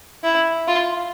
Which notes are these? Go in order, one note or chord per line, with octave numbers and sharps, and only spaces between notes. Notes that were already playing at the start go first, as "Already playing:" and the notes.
E4
F4